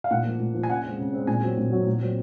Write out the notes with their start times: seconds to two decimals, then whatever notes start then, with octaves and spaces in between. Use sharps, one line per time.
0.04 F5
0.11 A#2 F#5
0.25 F3 A#3
0.40 A#2
0.54 F3 A#3
0.63 G#5
0.69 C#3 F#5
0.83 G#3 C4
0.99 C#3
1.13 G#3 C4
1.27 A#2 G#5
1.43 F#3 C4
1.57 A#2
1.72 F#3 C4
1.86 A#2
2.01 F#3 C4